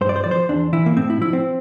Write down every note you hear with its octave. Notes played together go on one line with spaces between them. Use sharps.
G2 C5
D5
C5
F3 D5
C5
E2 D4
E3 E4
A#3
A2 C4
E4
F3 E4
C4